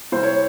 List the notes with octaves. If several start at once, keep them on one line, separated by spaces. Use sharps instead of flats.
C2 C5
C#5